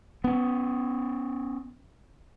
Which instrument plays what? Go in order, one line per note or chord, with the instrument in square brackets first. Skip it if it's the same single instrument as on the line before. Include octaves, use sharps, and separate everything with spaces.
[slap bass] B3 C#4